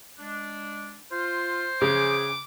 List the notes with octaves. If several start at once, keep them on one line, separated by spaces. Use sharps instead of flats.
G#3 D4
F4 C5
C#3 G#4 D6